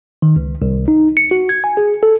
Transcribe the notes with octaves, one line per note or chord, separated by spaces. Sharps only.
D#3
C#2
C2
D#4
C#7
F#4
G#6
G#5
G#4
A4